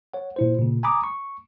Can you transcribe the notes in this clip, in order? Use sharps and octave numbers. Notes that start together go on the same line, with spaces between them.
C#5 F#5
A#2 E4 C5
A#2 C#3
G#5 A#5 B5 D6 D#6
C#6